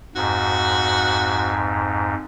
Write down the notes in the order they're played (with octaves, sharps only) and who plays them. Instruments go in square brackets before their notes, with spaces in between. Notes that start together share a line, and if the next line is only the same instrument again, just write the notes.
[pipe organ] F2 G#2 [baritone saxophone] F#4